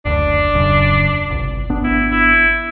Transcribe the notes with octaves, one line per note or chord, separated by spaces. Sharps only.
F#1 D2 D4
D#1 F#2 C#3
G1 C2
G#1 B3 D4
E4
E4